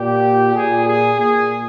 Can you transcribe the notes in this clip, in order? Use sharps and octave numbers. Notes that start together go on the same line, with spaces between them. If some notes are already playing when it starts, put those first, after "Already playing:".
Already playing: A#2 G4
A#2 G#4
G#4
A#2 G#4